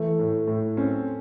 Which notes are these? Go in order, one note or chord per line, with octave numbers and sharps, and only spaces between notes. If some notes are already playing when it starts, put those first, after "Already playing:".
Already playing: E3 A3
A2
A2
C4 C#4